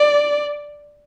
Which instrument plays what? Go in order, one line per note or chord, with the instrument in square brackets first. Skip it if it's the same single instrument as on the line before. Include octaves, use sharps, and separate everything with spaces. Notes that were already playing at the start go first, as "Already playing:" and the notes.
Already playing: [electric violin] D5